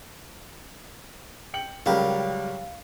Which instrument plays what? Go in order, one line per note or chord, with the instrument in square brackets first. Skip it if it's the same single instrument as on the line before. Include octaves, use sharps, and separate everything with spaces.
[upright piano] G5 C#7 F#7
[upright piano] C#2 G3 A#4 [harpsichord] F#3 G4 [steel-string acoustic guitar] F5